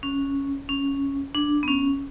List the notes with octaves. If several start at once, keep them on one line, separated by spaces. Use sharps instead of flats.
C#4
C#4
D4
B3
C#4